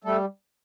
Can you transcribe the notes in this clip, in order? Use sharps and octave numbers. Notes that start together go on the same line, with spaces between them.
G3 A3 A4